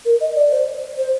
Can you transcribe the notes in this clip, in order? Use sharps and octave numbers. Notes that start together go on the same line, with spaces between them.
A#4
D#5
D5
C5
C5